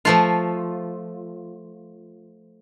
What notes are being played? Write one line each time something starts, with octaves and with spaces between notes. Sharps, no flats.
F3 A3 F4